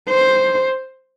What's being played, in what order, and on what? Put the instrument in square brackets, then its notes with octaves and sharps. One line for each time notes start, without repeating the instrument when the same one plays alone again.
[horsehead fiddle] C5